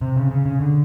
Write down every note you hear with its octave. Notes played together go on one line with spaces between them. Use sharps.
C3
C#3
C#3
C#3
D3